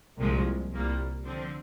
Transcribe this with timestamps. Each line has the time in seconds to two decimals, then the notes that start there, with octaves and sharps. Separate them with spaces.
0.17 C2 A#2 F3 G#3
0.71 C2 A#2 G3 A#3
1.25 D3 F3 C4